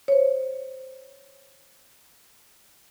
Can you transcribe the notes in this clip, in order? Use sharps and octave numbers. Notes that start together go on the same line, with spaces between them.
C5 C#5